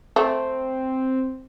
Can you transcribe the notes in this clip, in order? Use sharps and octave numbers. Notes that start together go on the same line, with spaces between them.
A3 C4